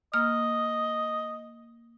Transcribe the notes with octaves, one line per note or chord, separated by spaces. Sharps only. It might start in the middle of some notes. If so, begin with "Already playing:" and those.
A#3 D#5 F6